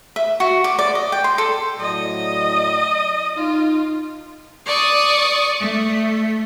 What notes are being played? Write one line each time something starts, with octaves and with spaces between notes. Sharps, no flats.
E5
F#4
D5
D5
D#5
G5
C6
A4
A2 F#3 D5 D#5
D#4 F4
D5 C#6 D#6
A3